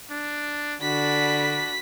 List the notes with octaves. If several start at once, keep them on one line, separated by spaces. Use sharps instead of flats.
D4
D3 D4 F#4 B5 B6